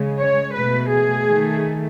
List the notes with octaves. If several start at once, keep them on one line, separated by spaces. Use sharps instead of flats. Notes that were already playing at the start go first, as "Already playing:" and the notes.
Already playing: C#3 G#3
C#5
B2 A3 B4
G#4
D#3 A3